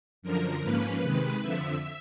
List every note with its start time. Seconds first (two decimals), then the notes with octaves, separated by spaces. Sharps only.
0.22 F#2 D3 F3 A#4
0.63 G#2 F3 A#3 C#4 B4
1.01 C3 D#3 G#3
1.42 F2 D3 F3 E5